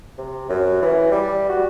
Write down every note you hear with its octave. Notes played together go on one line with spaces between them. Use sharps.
C3
F#2
E3
G3
F#4